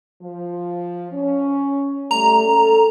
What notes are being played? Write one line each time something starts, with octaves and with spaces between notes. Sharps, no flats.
F3
C#4
G3 A3 A#5
C#4 A4